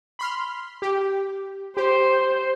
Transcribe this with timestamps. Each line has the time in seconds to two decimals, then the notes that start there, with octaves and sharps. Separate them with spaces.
0.19 B5 C6 F6
0.82 G4
1.77 G4 C5